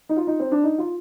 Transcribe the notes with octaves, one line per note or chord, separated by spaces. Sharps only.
D#4
F4
D#4
C4
D4
D#4
F4